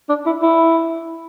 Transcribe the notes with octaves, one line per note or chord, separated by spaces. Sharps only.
D4
E4
E4